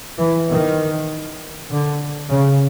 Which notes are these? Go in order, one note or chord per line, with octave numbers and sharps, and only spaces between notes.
E3
D#3
D3
C#3